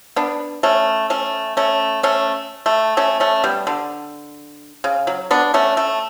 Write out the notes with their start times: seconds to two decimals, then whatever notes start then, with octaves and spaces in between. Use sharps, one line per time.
0.16 B3 D4
0.63 A3 C#4
1.10 A3 C#4
1.57 A3 C#4
2.03 A3 C#4
2.66 A3
2.97 A3 C#4
3.20 A3 C#4
3.44 G3 B3
3.67 D3
4.84 C#3
5.07 F#3
5.31 B3 D4
5.54 A3 C#4
5.77 A3